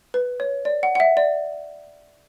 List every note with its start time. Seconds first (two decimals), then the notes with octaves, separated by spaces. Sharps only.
0.14 B4
0.40 C#5
0.65 D5
0.83 F#5
0.95 F#5
1.00 E5
1.17 D5